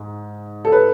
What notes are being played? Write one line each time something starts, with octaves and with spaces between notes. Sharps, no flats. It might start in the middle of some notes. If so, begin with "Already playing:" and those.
Already playing: G#2 G#3
A4
B4